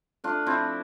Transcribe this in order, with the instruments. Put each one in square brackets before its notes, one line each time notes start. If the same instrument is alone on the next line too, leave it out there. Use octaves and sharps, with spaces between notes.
[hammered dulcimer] A3 D4 F4
F3 C4 E4